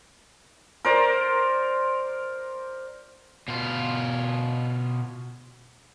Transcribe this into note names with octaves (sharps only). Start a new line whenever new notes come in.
A#4 C5 D5
B2 F4